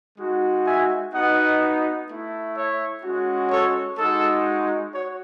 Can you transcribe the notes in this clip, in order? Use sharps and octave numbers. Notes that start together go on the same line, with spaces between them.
G#3 D#4 F#4
E5 G#5
B3 D#4 F#4 D#5 F#5
A3 E4
C#5 E5
G#3 C#4 F#4
A4 C#5
G#3 D#4 F#4 A4
F#4 C#5